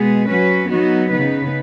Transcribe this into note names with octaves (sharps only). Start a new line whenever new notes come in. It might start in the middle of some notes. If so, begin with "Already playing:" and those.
Already playing: B2 G#3 B3 G#4
F#3 C#4 F#4 B4
F#3 B3 D#4 F#4
C#3 B3 D#4 B4